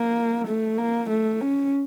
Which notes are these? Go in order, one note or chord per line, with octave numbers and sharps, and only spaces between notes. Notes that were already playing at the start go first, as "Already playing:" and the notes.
Already playing: A#3
A3
A#3
A3
C#4